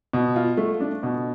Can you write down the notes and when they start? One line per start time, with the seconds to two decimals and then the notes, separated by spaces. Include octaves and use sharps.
0.13 B2
0.36 F4
0.57 A3
0.80 D4
1.03 B2